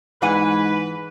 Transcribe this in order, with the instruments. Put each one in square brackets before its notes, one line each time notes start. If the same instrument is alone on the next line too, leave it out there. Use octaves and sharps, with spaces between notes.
[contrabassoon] G#2 [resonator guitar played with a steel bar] E3 F#5 G#5 [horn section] B4